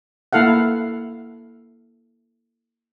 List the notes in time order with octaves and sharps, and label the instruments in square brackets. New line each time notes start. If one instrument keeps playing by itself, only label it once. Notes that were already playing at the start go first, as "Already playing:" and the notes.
[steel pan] A#3 E4 A4 F5 F#5